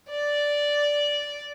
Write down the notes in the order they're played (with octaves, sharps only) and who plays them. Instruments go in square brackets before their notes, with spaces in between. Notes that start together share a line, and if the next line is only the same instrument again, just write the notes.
[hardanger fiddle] D5